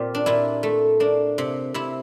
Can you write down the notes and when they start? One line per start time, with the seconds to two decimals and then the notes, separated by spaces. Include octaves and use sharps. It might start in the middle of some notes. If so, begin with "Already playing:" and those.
Already playing: A#2 C4 F4 G4
0.15 D4
0.26 A#2 E4
0.63 A3
1.00 A#3 D4
1.38 C3
1.74 C3 E4